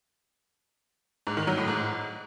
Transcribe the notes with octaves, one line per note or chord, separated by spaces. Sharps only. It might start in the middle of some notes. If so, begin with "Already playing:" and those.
G#2
D#3
F#3
A2
G#2